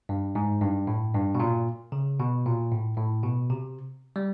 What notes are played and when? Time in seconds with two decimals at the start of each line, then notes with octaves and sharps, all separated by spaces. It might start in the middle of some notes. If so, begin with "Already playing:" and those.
0.09 G2
0.35 G#2
0.62 G2
0.87 A2
1.14 G2
1.35 B2
1.40 A#2
1.92 C#3
2.20 B2
2.46 A#2
2.72 A2
2.97 A2
3.23 B2
3.50 C3
4.16 G3